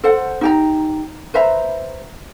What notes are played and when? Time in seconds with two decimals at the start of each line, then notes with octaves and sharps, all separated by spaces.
0.04 A4 C5 F#5
0.41 D#4 G4 A#5
1.34 B4 C5 E5 A#5